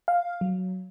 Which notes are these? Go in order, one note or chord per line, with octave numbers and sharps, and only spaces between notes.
F5
F#3